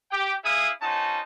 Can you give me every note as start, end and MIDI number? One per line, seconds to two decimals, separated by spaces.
0.12 0.35 67
0.12 0.35 79
0.44 0.71 64
0.44 0.71 68
0.44 0.71 76
0.44 0.71 77
0.44 0.71 87
0.82 1.20 61
0.82 1.20 63
0.82 1.20 66
0.82 1.20 72
0.82 1.20 81